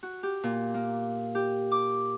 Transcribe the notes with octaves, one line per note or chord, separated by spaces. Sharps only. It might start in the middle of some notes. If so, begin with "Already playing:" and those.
F#4
G4
A#2
A#3
G4
D6